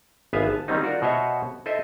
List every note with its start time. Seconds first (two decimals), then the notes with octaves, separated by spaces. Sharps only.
0.33 G#1 B3 B4 E5 F5 G#5
0.50 A5
0.68 D#3 G3 C4 C#4 D#4
0.82 F4 F#4 A#4 D5
1.02 B2 F#4 C5 C#5 D#5 E5
1.66 A4 C5 D#5 E5